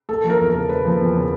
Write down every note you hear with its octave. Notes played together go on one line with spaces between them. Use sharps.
A#3 A4
F3
A#4
E2
A#4
C#3
A#3 B4
F3
E2
C#3